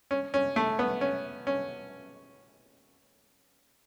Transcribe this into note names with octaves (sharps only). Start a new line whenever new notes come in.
C#4
C#4
A3
B3
C#4
C#4